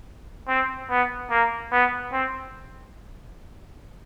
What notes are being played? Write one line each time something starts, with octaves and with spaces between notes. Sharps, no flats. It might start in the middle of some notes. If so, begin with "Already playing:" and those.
C4
B3
A#3
B3
C4